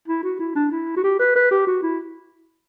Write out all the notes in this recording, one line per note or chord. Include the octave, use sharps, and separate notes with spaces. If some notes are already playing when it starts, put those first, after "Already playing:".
E4
F#4
E4
D4
E4
F#4
G4
B4
B4
G4
F#4
E4